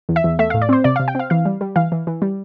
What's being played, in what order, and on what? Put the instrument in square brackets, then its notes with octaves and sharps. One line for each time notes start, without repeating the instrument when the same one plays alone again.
[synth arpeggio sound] E2
E5
E2
A3 E5
A2 F5
D5
C4 C5
C3 D5
C3 F5
G5
C4 F5
E3 F5
G3
G3
E3 F5
E3
E3
G3